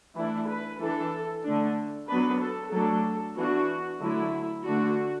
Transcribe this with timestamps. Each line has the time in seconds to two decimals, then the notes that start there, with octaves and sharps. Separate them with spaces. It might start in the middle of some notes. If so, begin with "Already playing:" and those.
0.15 E3 A3 D4 E4
0.48 B4
0.80 E3 D4 A4
1.44 D3 A3 D4
2.08 F#3 B3 D4 B4
2.41 A4
2.72 F#3 A3 D4 A4
3.36 E3 B3 D4 F#4
4.01 D3 F#3 A3 E4
4.65 D3 A3 D4 F#4